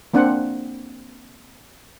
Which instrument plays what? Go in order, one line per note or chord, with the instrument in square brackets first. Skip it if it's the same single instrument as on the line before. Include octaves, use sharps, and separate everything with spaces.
[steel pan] A#3 C4 D4 C5 F#5